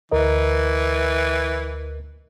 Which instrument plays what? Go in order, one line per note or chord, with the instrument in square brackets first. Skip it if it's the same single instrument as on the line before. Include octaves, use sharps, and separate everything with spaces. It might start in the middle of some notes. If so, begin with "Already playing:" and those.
[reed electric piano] D2 A#4 D#5 [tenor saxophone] E3